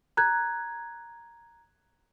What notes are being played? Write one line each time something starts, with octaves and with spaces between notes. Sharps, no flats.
A#5 F#6 G#6